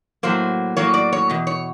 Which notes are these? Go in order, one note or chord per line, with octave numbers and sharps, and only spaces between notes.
A2 F#3 A#3 C5
A2 F#3 A#3 C#5
D5
C#5
E2 B2
C#5